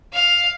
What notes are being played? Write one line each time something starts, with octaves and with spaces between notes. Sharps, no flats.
F5